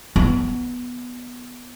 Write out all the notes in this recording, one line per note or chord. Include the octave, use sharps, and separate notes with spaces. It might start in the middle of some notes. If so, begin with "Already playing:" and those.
B3